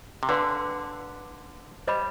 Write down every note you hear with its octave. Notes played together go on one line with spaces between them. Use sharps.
C3
D3 B4 D5 F5 G#5 C6
G3 C5 D#5 B5